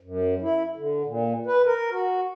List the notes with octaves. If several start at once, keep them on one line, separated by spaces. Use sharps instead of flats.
F#2
E4
D3
A#2
B4
A#4
F#4